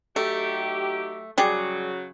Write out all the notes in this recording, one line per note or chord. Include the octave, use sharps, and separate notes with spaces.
F#3 A3 D#4 G4
C#3 F#3 G3 G4 G#4